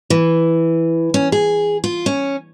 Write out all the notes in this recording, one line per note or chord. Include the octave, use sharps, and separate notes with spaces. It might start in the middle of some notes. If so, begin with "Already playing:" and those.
E3
C#4
G#4
F4
C#4